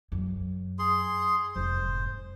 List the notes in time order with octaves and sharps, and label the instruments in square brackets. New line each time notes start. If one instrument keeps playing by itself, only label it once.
[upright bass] F#2
[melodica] G#4 C6
[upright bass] F1 G#2 [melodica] C5